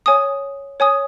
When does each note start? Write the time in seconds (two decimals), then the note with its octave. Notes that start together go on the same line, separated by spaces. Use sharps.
0.06 C#5 G#5 D#6
0.80 C#5 G#5 D#6